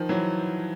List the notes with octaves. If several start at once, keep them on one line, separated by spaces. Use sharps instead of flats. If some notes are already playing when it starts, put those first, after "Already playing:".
Already playing: D#3 F3
E3 F#3